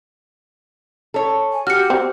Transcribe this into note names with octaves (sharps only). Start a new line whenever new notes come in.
A4 C#5
G#5
F#4 G4 F6 C#7
C4